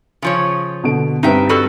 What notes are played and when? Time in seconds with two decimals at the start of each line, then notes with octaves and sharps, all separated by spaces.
0.22 C#3 F3 C#5
0.83 B2 D3 D7
1.23 G2 C4 D#4 B4 E5 G5
1.49 G3 F#4 A4